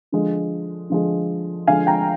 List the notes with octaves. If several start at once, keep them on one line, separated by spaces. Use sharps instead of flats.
D3 F3 G#3
D3 F3 G#3
D3 F3 G#3 F5 G#5
G5 A#5